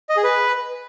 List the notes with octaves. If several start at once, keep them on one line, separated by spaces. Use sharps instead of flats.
D#5
G#4
B4